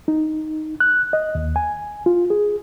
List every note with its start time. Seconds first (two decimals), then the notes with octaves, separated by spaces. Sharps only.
0.08 D#4
0.80 F#6
1.13 D#5
1.35 D#2
1.56 G#5
2.06 F4
2.30 G#4